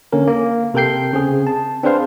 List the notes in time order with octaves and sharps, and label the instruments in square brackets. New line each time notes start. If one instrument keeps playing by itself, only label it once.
[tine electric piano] D3 A#3 C#4 A#4
A#3
C3 A4 A#4 G5 G6 C7
C#3 C4 G#4
A5
C4 D4 G#4 B4 C5 F5